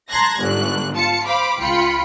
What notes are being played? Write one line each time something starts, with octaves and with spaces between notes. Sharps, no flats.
A5 A#5 C6 F#6 G#6 A#6
G1 G#2 D3 F#6
F4 A5 C#7
C5 F5 B5 D6
C#2 F4 G5 B5 C#7